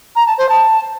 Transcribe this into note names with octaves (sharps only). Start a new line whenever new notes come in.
A#5
A5
C5
A5